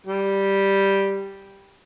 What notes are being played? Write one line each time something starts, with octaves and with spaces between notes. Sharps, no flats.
G3 G4